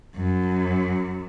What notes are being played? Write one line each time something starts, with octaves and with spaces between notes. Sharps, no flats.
F#2